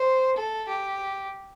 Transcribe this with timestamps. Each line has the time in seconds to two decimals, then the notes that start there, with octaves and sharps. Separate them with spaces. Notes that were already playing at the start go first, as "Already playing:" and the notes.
Already playing: C5
0.36 A4
0.69 G4